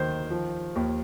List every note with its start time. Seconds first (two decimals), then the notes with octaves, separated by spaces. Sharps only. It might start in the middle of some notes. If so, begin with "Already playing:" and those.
Already playing: D#2 D#3 C5
0.30 F3
0.76 D#2